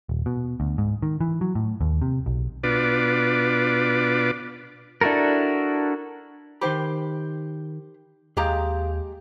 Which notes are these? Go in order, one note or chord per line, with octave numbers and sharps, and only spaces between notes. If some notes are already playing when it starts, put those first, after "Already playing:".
D#1
B2
D2
G#2
D#3
E3
F#3
A2
D#2
C3
B1
B2 D4 F4 B4 D6
D4 E4 F#4 A4 A#4
D#3 D#4 G4 C5 G5 B5
D#2 G#3 G4 G#4 F5 A#5